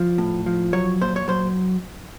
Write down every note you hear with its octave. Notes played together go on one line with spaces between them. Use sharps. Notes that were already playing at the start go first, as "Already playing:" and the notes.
Already playing: F3
A2
F3
F#3 C#5
A#2 C5
C#5
F#3 C5